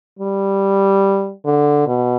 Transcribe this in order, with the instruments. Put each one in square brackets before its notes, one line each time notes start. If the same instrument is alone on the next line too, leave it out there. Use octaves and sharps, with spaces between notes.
[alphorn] G3
D3
B2